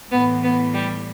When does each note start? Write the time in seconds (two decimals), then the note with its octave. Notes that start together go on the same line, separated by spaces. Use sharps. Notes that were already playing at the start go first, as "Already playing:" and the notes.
0.12 A2 E3 B3
0.44 B3
0.74 G3